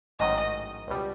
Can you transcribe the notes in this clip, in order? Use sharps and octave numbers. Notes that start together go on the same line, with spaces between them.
A1 G#2 D#3 F#3 D#5
C#2 B2 G3